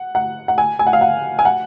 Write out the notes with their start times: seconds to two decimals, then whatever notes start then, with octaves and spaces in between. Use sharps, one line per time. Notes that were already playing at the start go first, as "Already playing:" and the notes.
Already playing: F#5
0.15 F#5
0.48 F#5
0.58 G#5
0.79 G#5
0.87 F#5
0.93 F5
1.01 F#5
1.39 G#5
1.45 F#5